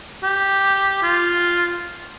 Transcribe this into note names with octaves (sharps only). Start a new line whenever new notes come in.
G4
F4